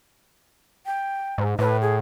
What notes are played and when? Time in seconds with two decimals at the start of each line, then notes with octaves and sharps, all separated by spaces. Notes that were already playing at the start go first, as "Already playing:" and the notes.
0.86 G5
1.38 G#2
1.59 A2 B4
1.81 G#4